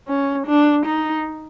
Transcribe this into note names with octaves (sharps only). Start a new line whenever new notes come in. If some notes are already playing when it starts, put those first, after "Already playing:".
C#4
D4
D#4